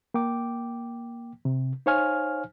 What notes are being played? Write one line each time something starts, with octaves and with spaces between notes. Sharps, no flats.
A#3 G5 D6
C3
D#4 C5 C#5 F5 G#5 F6